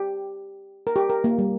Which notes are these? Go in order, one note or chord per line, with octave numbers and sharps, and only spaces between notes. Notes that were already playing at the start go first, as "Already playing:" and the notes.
Already playing: G4
A#4
G4
A#4
A#3
G3